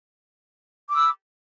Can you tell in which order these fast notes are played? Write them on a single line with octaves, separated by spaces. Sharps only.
D6 E6 B5